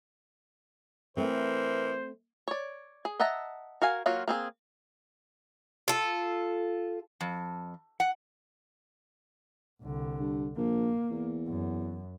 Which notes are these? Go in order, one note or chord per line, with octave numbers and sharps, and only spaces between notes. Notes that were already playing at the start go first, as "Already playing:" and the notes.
E3 A3 C4 A#4 C5
C#5 D5
G#4
D#5 E5 F#5 A5 A#5
F#4 A#4 F5 G#5
F#3 A#3 F4 F#4
A#3 C4 G#4
F4 A4
F2
F#5
C2 D3
G2
A#1 A#3
E2
F#2